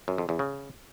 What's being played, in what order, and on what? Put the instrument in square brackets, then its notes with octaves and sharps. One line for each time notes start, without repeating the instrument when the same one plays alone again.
[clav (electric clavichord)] F#2
F2
E2
C#3